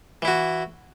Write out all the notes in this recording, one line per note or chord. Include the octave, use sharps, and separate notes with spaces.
E3 E4 F#4